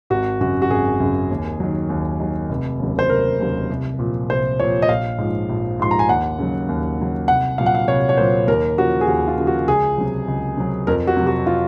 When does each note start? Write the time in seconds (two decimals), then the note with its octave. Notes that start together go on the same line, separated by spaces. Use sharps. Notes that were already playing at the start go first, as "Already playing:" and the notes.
0.10 G#1 F#4
0.41 F#2 C#3 F#4
0.62 F#4
0.70 G#1 G#4
1.00 F#2 C#3
1.30 D#2
1.60 D#3 F#3
1.89 D#2
2.20 D#3 F#3
2.49 F1
2.80 D#2 C#3 F#3
2.99 C5
3.10 F1 A#4
3.40 D#2 C#3 F#3
3.70 C2
3.99 A#2 F3
4.30 C2 C5
4.60 A#2 F3 C#5
4.82 D#5
4.89 A#1 F5
5.18 G#2 F3
5.49 A#1
5.79 G#2 F3 C6
5.91 A#5
5.99 G#5
6.09 D#2 F#5
6.39 C#3 F#3
6.69 D#2
6.99 C#3 F#3
7.28 C2 F#5
7.58 A#2 F#3 F5
7.66 F#5
7.75 F5
7.88 C2 C#5
8.09 C#5
8.17 A#2 F#3 C5
8.47 D#2 A#4
8.78 C#3 F3 F#4
9.01 G#4
9.07 D#2 F#4
9.28 F4
9.38 C#3 F3
9.47 F#4
9.68 C#2 G#4
9.98 C3 F#3
10.28 C#2
10.58 C3 F#3
10.87 F2 A#4
11.07 F#4
11.17 C3 F#3
11.27 F#4
11.46 F4